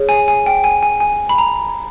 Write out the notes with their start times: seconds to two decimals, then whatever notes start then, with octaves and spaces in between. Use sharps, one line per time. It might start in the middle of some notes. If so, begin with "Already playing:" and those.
Already playing: G#4 C#5
0.09 G#5
0.28 G#5
0.46 G5
0.64 G#5
0.83 G#5
1.00 G#5
1.29 B5
1.38 A#5